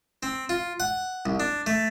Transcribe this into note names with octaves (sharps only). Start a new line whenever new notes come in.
C4
F4
F#5
C2
D4
A3